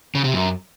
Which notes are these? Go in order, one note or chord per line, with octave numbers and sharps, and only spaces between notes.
C#3
C3
F#2